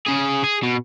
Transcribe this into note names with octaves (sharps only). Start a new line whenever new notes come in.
C#3 G#4
G#4
B2